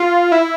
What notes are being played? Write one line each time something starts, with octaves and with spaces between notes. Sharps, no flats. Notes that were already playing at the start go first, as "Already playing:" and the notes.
Already playing: F4
E4